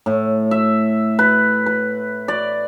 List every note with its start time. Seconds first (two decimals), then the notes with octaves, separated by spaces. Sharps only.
0.06 A2
0.51 E5
1.19 B4
1.66 B4
2.28 D5